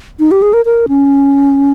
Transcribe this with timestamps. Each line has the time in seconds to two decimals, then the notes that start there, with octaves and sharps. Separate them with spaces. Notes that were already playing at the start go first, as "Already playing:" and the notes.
0.20 D#4
0.31 G4
0.42 G#4
0.53 A#4
0.65 A#4
0.88 C#4